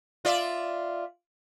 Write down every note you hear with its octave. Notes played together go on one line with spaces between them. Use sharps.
F4 D5 E5